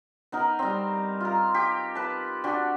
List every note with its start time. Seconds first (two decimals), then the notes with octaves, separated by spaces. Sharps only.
0.32 B3 D#4 A#4
0.59 G3 C4
1.20 F4 A#4
1.54 G4
1.95 B4 A5
2.44 D4 F#4 G4